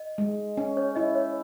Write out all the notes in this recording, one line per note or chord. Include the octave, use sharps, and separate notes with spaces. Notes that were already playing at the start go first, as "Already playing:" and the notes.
Already playing: D#5
G#3
C#4
C#5
E4 D#5
C#5